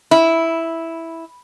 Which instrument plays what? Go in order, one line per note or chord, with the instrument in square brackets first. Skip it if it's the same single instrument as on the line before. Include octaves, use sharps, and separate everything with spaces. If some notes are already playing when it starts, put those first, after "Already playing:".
[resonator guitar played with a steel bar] E4